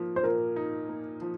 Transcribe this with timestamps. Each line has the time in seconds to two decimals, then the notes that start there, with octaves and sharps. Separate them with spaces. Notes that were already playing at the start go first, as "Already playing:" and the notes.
Already playing: A#2 F3 A#3 D#4
0.16 C5
0.23 A#2 A#4
0.56 D#4
0.89 A#3
1.22 F3